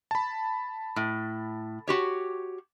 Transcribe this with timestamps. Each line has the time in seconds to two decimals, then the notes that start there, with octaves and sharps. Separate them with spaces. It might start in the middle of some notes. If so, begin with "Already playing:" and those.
0.11 A5 B5
0.96 A2
1.87 F#4 G4 C#5